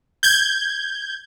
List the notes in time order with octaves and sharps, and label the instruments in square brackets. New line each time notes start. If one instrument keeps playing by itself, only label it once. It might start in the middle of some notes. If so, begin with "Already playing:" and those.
[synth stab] G6 G#6